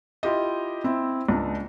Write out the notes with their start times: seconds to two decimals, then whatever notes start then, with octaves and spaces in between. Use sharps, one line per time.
0.23 E4 F4 G4 D#5
0.84 C4 E4
1.29 C#2 D4